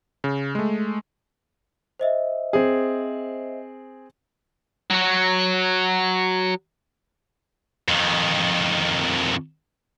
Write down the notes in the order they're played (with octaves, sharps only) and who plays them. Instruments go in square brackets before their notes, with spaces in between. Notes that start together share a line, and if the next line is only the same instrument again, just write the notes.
[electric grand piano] C#3
G#3 A3
[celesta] C5 D#5 E5
[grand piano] C4 G#4
[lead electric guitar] F#3 F#4
[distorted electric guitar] F2 D#3